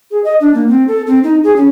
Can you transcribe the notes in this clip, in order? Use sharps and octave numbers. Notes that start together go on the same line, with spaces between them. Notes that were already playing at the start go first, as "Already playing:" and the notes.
G#4
D#5
D4
A#3
C4
A4
C4
D#4
G#4
C#4